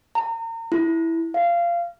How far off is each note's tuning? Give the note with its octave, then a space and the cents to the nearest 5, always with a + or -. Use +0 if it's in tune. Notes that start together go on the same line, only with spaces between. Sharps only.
A#5 -35
E4 -5
F5 -20